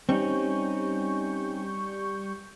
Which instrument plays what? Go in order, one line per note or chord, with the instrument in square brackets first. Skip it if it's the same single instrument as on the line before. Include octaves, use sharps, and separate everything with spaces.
[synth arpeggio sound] G3 C#6 G6 [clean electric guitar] C4 C#4 D#4